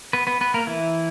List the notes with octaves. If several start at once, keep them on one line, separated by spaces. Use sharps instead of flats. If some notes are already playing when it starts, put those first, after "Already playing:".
B3 B4
B3 B4
B3 B4
A#3 A#4
E3 E4